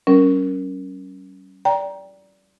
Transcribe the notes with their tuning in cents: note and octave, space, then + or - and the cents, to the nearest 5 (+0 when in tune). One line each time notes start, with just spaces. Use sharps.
G3 -40 C#4 +0 A#4 +0
D5 -15 G5 +0 A#5 +15